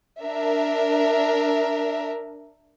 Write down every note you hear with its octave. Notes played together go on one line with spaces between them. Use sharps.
D4 A#4 E5